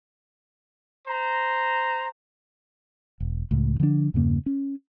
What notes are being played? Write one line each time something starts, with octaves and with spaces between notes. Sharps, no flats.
C5 A#5
E1
C#2 A2
D3 F3 G#3 D4
E2 G2 C#3 A#3
C#4